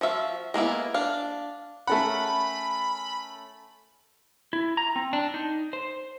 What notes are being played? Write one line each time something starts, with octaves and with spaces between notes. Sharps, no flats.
F3 F#4 E5 F5
G#3 A#3 B3 E4
D4 F5
A3 C#4 A4 A#4 F#5 B5
E4
A#5
C4
D4
D#4
C5